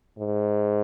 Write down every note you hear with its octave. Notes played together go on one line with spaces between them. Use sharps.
G#2